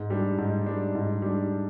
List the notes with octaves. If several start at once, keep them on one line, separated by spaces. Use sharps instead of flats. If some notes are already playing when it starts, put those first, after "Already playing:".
Already playing: G#2
G3 D4
G#2
G3 D4
G#2
G3 D4